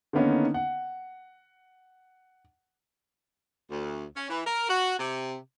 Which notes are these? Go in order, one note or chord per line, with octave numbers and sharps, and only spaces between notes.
D3 D#3 A#3 B3 C#4 D#4
F#5
D2
C#4
E3
A#4
F#4
C3